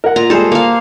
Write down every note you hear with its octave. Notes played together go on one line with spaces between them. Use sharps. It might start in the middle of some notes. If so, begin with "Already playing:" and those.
A#4 F#5
A#2 A#5
G3 G#3 G#4 A4 C5
A#3 F5